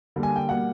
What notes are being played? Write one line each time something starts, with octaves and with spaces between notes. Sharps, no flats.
D3 G3 A#3
G#5
G5
B2 G3 A#3 F#5